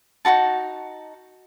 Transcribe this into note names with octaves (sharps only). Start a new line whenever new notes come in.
D#4 F4 F#4 A5